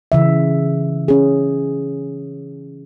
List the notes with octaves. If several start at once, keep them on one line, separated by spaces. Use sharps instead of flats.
C#3 E3 E5
C#4 G#4